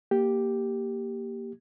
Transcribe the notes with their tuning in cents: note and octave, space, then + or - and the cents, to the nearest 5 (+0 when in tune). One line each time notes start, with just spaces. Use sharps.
A#3 +0 G4 +0